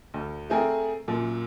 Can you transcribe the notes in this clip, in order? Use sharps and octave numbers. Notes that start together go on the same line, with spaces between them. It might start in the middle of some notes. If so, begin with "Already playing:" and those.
D2
A3 C4 G#4 A#4
F#2 A#2